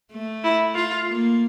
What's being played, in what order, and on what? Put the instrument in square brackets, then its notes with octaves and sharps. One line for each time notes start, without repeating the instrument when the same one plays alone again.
[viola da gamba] A3
[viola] E4
F4
[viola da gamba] A#3